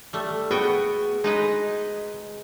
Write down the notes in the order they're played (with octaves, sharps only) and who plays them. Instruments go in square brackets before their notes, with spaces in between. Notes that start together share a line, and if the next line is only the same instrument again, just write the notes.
[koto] G3 A3
[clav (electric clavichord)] B3 [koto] F#4 G5 [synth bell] G#4
[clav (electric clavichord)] G#3 [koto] D#4 B4 D#5